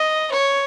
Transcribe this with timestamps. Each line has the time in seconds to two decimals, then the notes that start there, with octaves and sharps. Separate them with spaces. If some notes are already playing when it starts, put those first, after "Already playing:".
Already playing: D#5
0.32 C#5